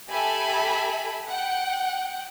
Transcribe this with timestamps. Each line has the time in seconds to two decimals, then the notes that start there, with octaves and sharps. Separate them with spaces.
0.10 G4 A4 E5 G#5 B5
1.29 F#5 G5